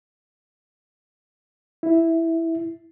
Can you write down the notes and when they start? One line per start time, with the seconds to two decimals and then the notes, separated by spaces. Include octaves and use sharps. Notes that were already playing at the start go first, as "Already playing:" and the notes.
1.83 E4